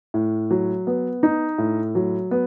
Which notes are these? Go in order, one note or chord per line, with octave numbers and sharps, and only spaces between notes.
A2
F#3
B3
D#4
A2
F#3
B3